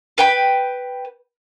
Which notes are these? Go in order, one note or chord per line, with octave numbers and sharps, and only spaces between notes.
B4 G5 B5